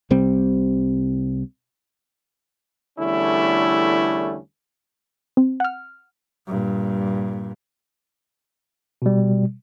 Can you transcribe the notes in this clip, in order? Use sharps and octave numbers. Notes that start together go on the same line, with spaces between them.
C2 C3 G3 C4
E2 D3 G3 A3 C#4 E4
C4
F#5 F6
G2 A#2
B2 G3